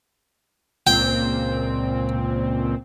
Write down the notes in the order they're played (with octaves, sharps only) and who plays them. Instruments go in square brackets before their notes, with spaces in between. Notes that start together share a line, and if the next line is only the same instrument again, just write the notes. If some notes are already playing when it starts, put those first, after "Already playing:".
[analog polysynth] C#2 A#2 C4 [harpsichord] G5